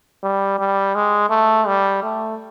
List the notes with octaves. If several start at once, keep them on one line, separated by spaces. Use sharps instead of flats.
G3
G3
G#3
A3
G3
A3